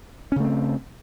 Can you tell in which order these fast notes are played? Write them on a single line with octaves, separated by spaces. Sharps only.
C#4 C#3 A3 C4